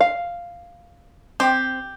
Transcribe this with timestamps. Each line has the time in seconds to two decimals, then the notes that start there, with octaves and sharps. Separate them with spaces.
0.01 F5
1.40 C4 G4